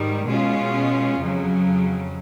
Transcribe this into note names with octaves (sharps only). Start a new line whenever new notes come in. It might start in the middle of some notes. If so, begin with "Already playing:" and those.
Already playing: G#2 D#3 G3
B2 G#3 C#4 F4
F2 C#3 F#3